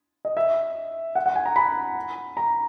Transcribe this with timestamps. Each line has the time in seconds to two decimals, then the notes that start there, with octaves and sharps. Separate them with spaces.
0.25 D#5
0.37 E5
1.15 F#5
1.26 F#5
1.35 G#5
1.45 A#5
1.56 B5
2.37 A#5